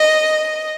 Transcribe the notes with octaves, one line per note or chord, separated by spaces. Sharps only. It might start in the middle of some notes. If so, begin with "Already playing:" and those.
Already playing: D#5